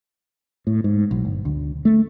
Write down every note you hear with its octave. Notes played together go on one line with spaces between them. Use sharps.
A2
G#2
B1
G1
D2
A3